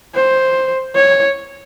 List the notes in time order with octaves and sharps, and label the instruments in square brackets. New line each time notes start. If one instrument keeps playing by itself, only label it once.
[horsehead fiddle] C5
C#5